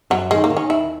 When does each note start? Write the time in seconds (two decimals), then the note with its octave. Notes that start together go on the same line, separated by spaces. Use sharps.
0.10 F#2 F#3
0.31 D#3 G#3
0.44 A#3
0.50 D#3
0.57 C#4
0.70 D#2 E4